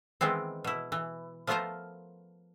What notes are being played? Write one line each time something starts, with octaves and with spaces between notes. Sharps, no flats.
D#3 E3 G#3 B3 C4
B2 E4
E3
F3 A3 B3 F4 A#4 C5